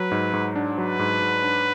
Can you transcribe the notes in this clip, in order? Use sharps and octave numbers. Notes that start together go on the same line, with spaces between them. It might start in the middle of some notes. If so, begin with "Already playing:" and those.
Already playing: F#3 B4
G#2
G#2
D4
F#3 B4
G#2
G#2
D4